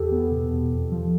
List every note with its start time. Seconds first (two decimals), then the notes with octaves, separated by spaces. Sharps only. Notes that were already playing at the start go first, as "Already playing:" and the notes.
Already playing: E2 G4 A4
0.11 B3
0.31 B2
0.51 E2
0.72 F2
0.92 F3